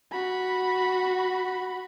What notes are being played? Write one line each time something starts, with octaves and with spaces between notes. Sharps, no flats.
F#4 B5